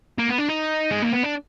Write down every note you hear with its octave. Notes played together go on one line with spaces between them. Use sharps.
A#3
B3
D4
D#4
G#3
A#3
B3
D4